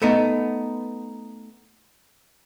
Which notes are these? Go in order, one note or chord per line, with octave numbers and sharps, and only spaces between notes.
A3 B3 D#4